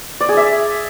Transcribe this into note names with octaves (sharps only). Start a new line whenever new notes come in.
D5
G#4
E5